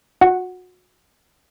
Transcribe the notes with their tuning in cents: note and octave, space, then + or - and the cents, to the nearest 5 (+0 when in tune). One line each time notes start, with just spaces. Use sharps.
F#4 -30 F#5 +0